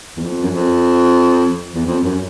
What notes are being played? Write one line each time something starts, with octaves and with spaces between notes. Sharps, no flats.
E2
F2
F#2
F2
E2
F2
F#2